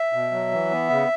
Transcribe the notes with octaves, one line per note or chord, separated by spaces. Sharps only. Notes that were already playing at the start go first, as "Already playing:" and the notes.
Already playing: E5
B2
F#3
E3
B3
C#3